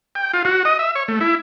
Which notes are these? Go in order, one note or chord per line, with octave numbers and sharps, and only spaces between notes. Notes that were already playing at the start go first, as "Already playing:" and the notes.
G5
F4
F#4
D#5
E5
C#5
A3
E4